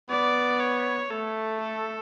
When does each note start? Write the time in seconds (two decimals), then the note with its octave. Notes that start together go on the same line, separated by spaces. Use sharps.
0.10 B3 D5
0.60 C#5
1.10 A3 A4
1.60 A4